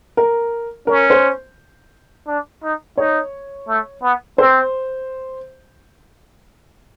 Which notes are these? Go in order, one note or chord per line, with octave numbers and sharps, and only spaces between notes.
A#4
C#4 A#4
C5
D4
D#4
D#4 C#5
A3
B3
C4 C5